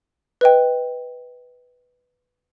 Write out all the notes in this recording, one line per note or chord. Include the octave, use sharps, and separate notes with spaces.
B4 D#5 G5